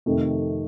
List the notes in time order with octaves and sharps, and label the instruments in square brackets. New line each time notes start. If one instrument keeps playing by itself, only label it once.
[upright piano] F2 C3 D#3 A3